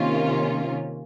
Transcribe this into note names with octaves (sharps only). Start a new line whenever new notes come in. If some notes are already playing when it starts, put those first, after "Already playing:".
Already playing: C3 D#3 A#3 C#4 F4